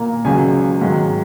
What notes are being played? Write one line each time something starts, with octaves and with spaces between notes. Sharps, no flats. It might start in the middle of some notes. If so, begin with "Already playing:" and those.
Already playing: A#2 A#3 A#5
C#2 C#3 F#3 G#5
G#2 D#3 F#3